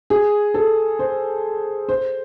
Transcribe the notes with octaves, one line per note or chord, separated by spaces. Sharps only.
G#4
A4
C5
C5